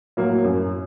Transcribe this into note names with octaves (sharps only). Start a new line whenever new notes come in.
A2 F#3 A#3
F#2